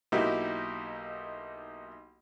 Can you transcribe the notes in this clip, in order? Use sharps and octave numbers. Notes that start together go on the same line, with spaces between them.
B1 A#3 D#4 E4 F#4 G4